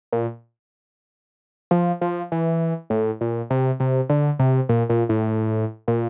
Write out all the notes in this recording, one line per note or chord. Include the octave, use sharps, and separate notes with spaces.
A#2
F3
F3
E3
A2
A#2
C3
C3
D3
C3
A#2
A#2
A2
A#2